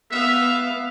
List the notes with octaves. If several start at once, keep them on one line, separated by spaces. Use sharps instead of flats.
B3 E5 F5